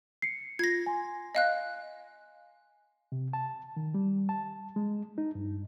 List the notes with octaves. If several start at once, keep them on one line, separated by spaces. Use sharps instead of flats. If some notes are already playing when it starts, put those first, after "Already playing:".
C7 C#7
F4 G#6 A#6
G#5 C6
D#5 F5 F#6
C3
A5
D#3
G3
A5
G#3
D#4
G2